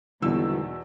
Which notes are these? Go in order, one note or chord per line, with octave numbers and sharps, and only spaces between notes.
G#1 E2 B2 D3 E3 G3 E6